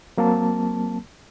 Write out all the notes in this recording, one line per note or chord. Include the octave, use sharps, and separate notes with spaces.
F#3 A#3 C4 A5